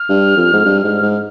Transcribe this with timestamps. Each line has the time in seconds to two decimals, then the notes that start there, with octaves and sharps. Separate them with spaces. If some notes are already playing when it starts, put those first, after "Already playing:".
Already playing: F6
0.09 G2
0.37 F2
0.53 G#2
0.65 G2
0.84 G#2
1.02 G#2